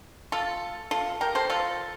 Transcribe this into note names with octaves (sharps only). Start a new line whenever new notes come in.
F4 A4
F4 A4
G4 A#4
A4 C5
F4 A4